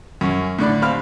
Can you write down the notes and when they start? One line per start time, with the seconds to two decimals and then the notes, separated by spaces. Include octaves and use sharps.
0.21 F#2 C#4
0.59 A2 D3 D5 B5
0.82 D#2 C4 F5 B5 F6